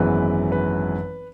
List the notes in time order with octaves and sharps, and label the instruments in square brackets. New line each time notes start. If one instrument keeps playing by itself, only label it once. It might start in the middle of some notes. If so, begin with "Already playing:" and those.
Already playing: [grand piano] G#1 F#2 E3 G#3 B3 B4
B4